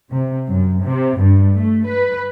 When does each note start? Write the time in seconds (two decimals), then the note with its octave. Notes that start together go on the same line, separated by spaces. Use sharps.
0.11 C3
0.47 F#2
0.82 C3
1.18 G2
1.55 A3
1.87 B4